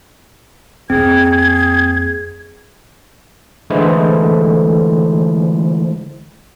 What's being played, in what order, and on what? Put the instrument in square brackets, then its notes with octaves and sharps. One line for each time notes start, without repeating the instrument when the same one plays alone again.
[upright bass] F2 A#3 [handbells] C4 [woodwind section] G#4 [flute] G#6
[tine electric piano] D3 E3 G#3 A3 E4 C5